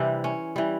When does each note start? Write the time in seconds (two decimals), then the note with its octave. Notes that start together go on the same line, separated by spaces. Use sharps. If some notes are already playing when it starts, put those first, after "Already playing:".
Already playing: C3 E3 G3 C4 D4
0.24 C#4
0.56 E3 G3